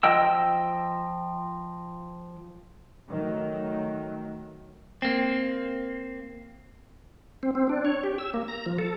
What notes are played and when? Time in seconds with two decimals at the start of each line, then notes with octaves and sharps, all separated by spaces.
0.03 F3 D#5 G5 E6
3.09 D#3 F#3 A3
5.02 A#3 C4
7.43 C4
7.55 C4
7.69 D4
7.85 C#5
8.04 G4
8.18 E6
8.34 A#3
8.48 A#5
8.66 F3
8.78 A4